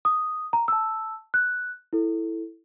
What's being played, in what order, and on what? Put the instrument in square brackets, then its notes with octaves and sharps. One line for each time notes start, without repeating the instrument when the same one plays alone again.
[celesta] D#6
A#5
A5 E6
F#6
E4 A4